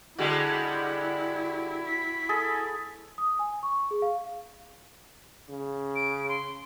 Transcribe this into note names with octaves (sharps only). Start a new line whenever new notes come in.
D3 G3 G#3 E4 F#4 F#5
B6
G#4 A4
D#6
G#5
C#6
G#4
F5
C#3
D7
C6